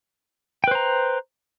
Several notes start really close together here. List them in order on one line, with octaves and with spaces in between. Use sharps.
G5 B4 C5 A#5